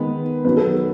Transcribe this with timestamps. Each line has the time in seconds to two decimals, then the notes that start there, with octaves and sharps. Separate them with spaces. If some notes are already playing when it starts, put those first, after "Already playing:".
Already playing: D#3 G#3 B3 B4
0.44 D#3 F#3 B3 B4
0.57 A4